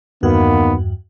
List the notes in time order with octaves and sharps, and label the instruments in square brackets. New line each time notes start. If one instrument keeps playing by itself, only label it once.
[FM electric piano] E2 G2 F#4 [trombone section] D#3 A#3 B3